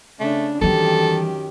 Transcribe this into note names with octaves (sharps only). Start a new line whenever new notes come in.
C#3 A3 D4
F#2 D#3 E3 G3 G4 A4